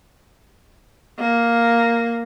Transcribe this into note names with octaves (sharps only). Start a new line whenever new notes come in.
A#3